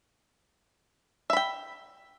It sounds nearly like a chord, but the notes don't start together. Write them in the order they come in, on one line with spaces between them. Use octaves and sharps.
E5 B5 G5